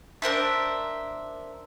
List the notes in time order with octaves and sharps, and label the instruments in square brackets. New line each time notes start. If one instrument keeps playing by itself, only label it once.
[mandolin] D4 A#4 C5 E5